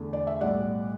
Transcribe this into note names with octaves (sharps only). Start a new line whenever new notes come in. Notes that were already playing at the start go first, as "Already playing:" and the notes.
Already playing: E2 D3 A3
D5
E5
B1 A2 G3 D5 F#5